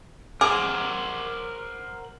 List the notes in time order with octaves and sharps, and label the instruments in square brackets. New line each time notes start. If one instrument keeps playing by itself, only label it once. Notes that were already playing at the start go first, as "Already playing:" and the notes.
[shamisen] G#4 [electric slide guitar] A#4 C5 F#5 [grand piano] D6